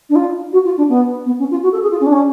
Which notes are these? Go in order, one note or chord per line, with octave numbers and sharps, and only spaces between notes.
D4
F4
F#4
F4
D4
B3
B3
C#4
F4
F#4
A4
G#4
F4
C#4
D4
C#4